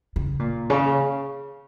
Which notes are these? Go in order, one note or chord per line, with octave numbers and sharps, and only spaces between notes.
C#3
A#2
C#3